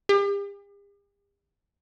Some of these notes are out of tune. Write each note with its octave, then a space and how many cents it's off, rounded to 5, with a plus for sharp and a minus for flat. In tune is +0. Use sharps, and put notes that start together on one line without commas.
G4 +45